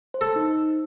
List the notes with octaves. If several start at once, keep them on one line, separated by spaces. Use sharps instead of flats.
C5
A4
D#4